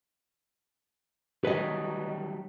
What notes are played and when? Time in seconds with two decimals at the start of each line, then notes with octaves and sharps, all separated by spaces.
1.45 D#3 F#3 G3 B4 D#5